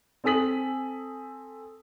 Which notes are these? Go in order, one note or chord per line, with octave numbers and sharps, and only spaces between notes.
C4 A4 G#5 D#6 B6 F#7